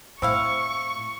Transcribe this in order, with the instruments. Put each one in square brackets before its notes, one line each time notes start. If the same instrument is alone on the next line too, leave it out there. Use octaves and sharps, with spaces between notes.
[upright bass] A2 [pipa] C4 E4 F5 [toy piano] C5 E6 [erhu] C#6